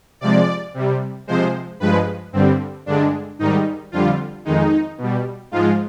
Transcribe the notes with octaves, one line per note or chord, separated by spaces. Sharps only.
C3 F3 G#3 D5
C3 G3
C3 F3 G#3 C5
G2 F3 G#3 B4
G2 D3 G3 C4
G2 D3 G#3 D4
G#2 D#3 G3 D#4
F2 D3 G3 F4
F2 D#3 G#3 D#4
B2 G3
G#2 F3 G#3 F4